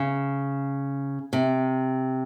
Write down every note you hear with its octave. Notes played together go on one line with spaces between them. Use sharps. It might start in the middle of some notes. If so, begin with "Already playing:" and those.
Already playing: C#3
C3